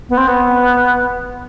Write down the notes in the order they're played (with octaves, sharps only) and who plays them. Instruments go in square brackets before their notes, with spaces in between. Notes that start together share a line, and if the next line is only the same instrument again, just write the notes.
[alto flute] B3
C4
B3